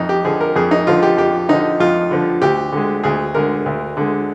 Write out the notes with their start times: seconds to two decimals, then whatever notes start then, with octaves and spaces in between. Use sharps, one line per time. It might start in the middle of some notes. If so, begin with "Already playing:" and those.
Already playing: F2 D#4
0.09 G4
0.25 D3 F3 G#4
0.41 A#4
0.56 F2 G#4
0.71 D#4
0.87 D3 F3 F4
1.03 G4
1.17 F2 G4
1.49 D3 F3 D#4
1.80 F2 F4
2.11 D3 F3
2.42 D2 G4
2.72 D3 G#3
3.04 D2 G#4
3.35 D3 G#3 A#4
3.66 D2
3.97 D3 G#3